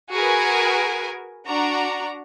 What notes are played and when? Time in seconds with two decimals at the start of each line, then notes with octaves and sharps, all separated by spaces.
0.11 F#4 G#4 A#4 B4 G#5
1.45 D4 F#4 A#5